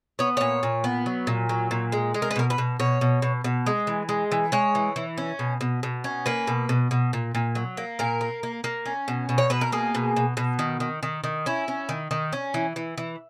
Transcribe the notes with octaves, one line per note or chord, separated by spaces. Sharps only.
B3 C#5
A#2 C#5
A#2
B3
F#3
A#2
F#3
A#2
G#3
G#3
A#4
B4
B2 A#4
B4
B2
B2 C#5
B2
B2
B2
G#3
E3
G#3
E3
G#3 C#5
E3
E3
C#4
B2
B2
B2
C#4
A#3 B4
B2
B2
B2
A#2
A#2
F#3
A#3
A#2 A#4
A#3
A#3
A#3
C#4
B2
B2
C#5
B2 B4
A#4
A#3 G#4
B2
B2
B2
D#3
D#3
D#3
D#3
C#4 E4
C#4
D#3
D#3
C#4
E3
E3
E3